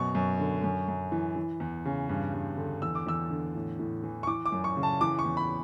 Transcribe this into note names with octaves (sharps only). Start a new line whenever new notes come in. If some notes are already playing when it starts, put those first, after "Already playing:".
Already playing: F#2 B2 C#6
F#2
D3
F#2
F#2
E3
E3
E2
C#3
G2
G2
D3
E2 E6
D6
E2 E6
D3
A2
A2
E3
C#6
E3 D6
D6
F#2
C#6
C#3
A5
E3 D6
C#6
E2
B5